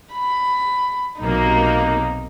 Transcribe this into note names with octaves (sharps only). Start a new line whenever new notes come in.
B5
B1 C3 A#3 D#4